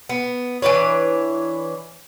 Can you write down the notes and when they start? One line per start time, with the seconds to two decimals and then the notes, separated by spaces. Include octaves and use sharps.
0.09 B3
0.62 E3 D4 B4 C#5